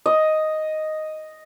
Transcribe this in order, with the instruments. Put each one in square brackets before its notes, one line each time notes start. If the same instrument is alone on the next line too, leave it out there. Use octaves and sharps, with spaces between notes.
[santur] D#5